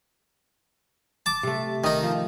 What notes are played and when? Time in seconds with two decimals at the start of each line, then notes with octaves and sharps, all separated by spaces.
1.26 A5 D6
1.43 C3 A3
1.84 D#3 D#4 D#5
2.03 F3